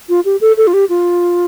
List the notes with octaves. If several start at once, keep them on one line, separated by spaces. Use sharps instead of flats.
F4
G4
A4
A4
F4
G4
F4